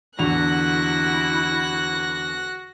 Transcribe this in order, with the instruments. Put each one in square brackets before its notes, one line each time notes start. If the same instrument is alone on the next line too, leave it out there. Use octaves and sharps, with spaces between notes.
[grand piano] E2 D3 F7 [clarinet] E4 [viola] F#4 [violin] F#6 A#6